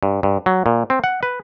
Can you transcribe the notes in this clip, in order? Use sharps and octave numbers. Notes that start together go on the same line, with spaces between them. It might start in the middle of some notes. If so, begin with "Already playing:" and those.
G2
G2
F#3
A#2
C4
F#5
B4